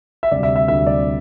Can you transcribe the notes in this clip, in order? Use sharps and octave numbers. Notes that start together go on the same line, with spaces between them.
E5
D2 C3 G3 D5
E5
E5
D2 C3 G3 E5
D5